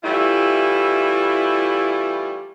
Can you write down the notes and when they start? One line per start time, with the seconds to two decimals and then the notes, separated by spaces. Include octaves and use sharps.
0.03 E3 G3 A3 E4 F4